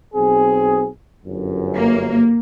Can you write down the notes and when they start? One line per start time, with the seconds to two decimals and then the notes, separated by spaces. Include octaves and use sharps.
0.14 B1 C4 G#4
1.26 G1 F#2
1.75 A#3